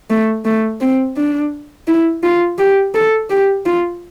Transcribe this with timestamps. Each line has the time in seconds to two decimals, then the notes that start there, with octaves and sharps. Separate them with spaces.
0.10 A3
0.45 A3
0.81 C4
1.17 D4
1.88 E4
2.23 F4
2.58 G4
2.95 A4
3.30 G4
3.66 F4